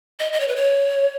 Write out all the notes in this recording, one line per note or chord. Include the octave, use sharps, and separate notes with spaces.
D#5
D#5
C#5
B4
C#5